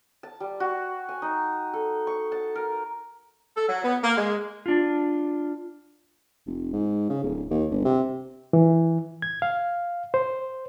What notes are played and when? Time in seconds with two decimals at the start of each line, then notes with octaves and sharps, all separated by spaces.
0.23 A5
0.40 G3
0.60 F#4
1.09 G#5
1.22 D#4
1.73 A4
2.07 C#6
2.32 A5
2.55 A#4
3.57 A4
3.69 F#3
3.84 B3
4.04 A#3
4.17 G#3
4.66 D4 F4
6.46 F1
6.73 G#2
7.10 C#3
7.23 D1
7.50 D#2
7.71 G1
7.85 C3
8.53 E3
9.22 G#6
9.42 F5
10.14 C5